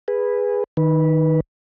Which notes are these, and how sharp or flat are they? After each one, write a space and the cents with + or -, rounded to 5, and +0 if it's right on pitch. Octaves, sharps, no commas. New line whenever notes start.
G#4 -15 B4 +0
D#3 +0 B4 -15